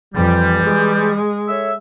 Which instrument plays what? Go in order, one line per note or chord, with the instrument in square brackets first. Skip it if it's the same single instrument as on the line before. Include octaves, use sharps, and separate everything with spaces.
[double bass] F2 [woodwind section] E3 G3
[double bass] G#3
[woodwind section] A4 C#5 E5